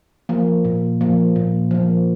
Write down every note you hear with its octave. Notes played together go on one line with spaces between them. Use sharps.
F3 A#3
A#2
F3 A#3
A#2
F3 A#3